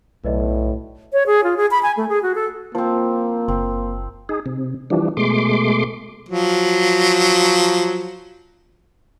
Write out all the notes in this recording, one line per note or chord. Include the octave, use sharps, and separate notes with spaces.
B1 A2 B4 D5 D#5
C#5
G#4
F4
G#4
B5
G#5
A3
G#4
F#4
A4
F3 A#3 C4
F#1 C4
D#4 G#4
C3
E3 F3 G3 D4
B2 G#3 A3 C6 D6
F3 F#3